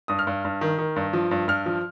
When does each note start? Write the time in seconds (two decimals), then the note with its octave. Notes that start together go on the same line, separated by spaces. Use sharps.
0.08 G2 D#6
0.19 F6
0.27 G2
0.45 G2
0.61 D#3
0.78 D#3
0.96 G2
1.13 F3
1.31 G2
1.48 G2 F6
1.66 F3